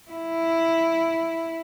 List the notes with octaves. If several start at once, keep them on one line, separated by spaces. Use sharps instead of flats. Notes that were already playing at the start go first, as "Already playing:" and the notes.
E4